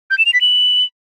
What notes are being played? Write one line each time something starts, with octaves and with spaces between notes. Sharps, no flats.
G6
E7
F7
B6
F#7